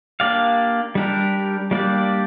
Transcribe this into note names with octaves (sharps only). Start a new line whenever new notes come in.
A#3 D4 G4 D5 F5
G3 D4 G4 A#4
G3 A#3 D4 G4 D5